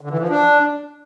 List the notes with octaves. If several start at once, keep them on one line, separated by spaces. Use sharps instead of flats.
D3
E3
F3
D4